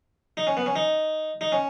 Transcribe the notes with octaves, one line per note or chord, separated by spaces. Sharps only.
D#4
C#4
B3
C#4
D#4
D#4
C#4